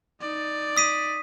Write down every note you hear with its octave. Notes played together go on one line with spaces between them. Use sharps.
D#4 D5
D#6 B6 D#7